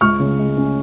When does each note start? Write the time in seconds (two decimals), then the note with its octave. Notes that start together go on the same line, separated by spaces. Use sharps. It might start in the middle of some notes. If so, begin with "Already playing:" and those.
0.01 C#2 C#6 F6
0.20 C#3
0.39 G#3
0.57 C#4